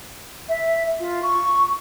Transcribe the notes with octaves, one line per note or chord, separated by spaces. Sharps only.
E5
F4
C#6